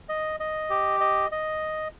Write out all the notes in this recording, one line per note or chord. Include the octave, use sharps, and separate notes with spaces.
D#5
D#5
G4
D#5
D#5